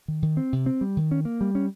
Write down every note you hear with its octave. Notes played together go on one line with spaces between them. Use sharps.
D#3
D#3
C4
C3
C4
G3
D#3
C#4
A#3
G3
C#4